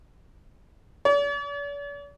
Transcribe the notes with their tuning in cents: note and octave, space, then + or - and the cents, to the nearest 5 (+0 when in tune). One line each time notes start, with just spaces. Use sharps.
D5 -45